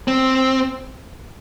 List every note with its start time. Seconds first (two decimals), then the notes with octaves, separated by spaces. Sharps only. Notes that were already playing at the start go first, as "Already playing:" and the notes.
0.08 C4